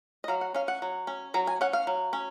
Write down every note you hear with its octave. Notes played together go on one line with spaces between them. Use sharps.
D#5
F#3 F5
F#5
C#4 F5
F#5
F#3
C#4
F#3 A#5
G#5
C#4 F#5
F5
F#3
C#4